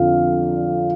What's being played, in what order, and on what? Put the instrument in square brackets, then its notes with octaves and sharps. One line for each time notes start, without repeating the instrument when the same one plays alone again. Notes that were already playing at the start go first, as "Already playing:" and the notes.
Already playing: [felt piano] F2 D3 F5